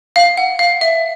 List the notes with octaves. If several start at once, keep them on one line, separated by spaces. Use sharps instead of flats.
F5
F#5
F5
E5